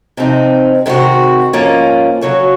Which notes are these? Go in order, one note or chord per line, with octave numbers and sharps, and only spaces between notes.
C3 F3 C4 D#4
C3 D#3 G#3 C4 F#4
G#2 F3 A#3 C#4 F4
C#3 F#3 C#4 F#4 C#5